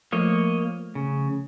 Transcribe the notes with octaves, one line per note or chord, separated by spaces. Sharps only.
F3 A3 A#3 C#5 D#5
C#3